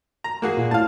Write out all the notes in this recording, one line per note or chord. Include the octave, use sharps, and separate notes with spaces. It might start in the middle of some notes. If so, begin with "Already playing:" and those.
A#5
A#3 F#4 G#4
A#2
A2 F5 A5